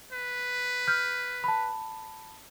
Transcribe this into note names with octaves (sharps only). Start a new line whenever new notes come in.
B4
F6 G6
A5 B5